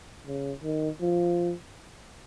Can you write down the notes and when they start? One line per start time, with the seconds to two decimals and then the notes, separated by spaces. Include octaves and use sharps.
0.27 C#3
0.63 D#3
1.01 F3